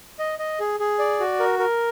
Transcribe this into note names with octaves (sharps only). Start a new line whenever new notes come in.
D#5
D#5
G#4
G#4
D5
F#4
A#4
A#4